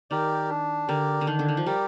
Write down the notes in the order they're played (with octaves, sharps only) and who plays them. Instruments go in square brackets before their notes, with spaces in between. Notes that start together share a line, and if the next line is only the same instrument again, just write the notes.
[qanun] D#3 [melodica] G4 A#4 D5
[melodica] D4
[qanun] D3 [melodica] G4 A#4 D5
[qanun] D3
[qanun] D#3 [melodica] D4
[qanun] D3
D#3
F3
[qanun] G3 [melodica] G4 A#4 D5